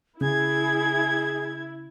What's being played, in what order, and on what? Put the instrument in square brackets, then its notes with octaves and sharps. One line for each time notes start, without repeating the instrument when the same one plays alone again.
[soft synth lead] C#3 [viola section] E4 [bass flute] G#4 [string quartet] G#6